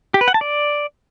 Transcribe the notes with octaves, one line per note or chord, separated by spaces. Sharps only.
G4
B4
F#5
A5
D5